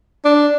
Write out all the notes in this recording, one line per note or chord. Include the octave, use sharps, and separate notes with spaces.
D4